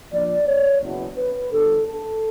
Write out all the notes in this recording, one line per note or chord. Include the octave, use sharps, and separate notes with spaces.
A#2 F3 A#3 D4 D5
C#5
F#1 E2 B2
B4
G1 G2 D3 G3 A4
A4